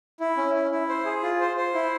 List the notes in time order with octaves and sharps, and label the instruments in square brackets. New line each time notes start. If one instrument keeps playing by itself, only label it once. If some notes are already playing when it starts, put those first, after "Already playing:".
[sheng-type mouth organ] E4
C#4
E4
E4
C5
G#4
F4
C5
C5
E4